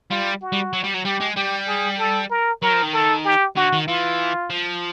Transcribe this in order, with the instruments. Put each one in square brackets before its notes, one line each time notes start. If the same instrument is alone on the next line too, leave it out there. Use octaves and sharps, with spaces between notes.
[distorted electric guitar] G3 [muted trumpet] F4
[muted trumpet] F#4
[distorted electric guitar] G3
F#3
G3
F#3
[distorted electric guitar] G3 [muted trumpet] G4
[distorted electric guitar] G#3
[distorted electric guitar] G3 [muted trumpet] G4
[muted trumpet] G#4
A4
A#4
[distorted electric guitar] F#3 [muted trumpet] A#4
[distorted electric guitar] F3
D#3
[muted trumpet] A4
G4
[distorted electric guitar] D3 [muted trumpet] F#4
[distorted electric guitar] D#3
[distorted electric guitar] E3 [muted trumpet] F4
[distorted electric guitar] F3